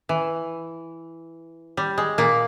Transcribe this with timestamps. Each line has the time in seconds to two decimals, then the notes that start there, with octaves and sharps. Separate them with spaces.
0.09 E3
1.77 G3
1.98 G#3
2.18 A#2 A#3